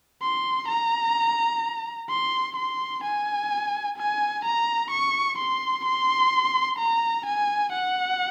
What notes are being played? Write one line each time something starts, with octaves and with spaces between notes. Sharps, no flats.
C6
A#5
C6
C6
G#5
G#5
A#5
C#6
C6
C6
A#5
G#5
F#5